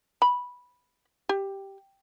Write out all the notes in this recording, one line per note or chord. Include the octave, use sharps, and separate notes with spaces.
B5
G4